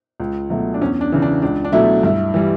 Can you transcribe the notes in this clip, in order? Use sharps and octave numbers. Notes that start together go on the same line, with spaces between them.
C#2
B2 F#3 A3
D4
E2 C#4
D4
C#3 E3
D4
C#2 D4
D4
B2 F#3 A3 E4
G2 E4
E3 G3